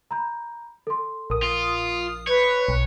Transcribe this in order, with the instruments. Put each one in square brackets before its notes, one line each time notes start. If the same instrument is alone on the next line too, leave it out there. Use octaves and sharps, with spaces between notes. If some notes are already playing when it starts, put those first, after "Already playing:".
[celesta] A#5 B5 G6
A4 C6
[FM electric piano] A#1 D#6 [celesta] A#4
[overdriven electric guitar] F4
[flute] B4 [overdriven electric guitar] C#5 [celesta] G6
[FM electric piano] B1